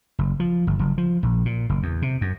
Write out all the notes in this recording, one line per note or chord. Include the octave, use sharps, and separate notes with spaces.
F#1
F3
G1
F#1
F3
A#1
A#2
F#1
E2
C3
F#2